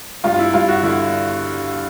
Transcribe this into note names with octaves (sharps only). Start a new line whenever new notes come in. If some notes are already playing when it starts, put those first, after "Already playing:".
G2 F4
F4
E4
G2 F4
F#4
D3 E4